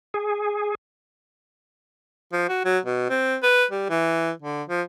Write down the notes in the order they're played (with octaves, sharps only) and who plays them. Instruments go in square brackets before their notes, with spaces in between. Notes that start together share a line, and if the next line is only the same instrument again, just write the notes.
[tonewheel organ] G#4
[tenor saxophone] F3
F#4
F#3
B2
C4
B4
G3
E3
D3
F3